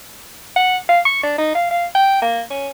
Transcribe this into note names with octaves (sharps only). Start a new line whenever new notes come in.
F#5
F5
C#6
D4
D#4
F5
F5
G5
A#3
C#4